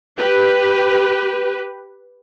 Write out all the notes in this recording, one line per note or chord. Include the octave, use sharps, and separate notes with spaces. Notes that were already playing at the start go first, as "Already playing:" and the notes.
G4 B4